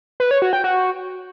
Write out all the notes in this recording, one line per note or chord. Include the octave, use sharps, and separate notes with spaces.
B4
C#5
F#4
G5
F#4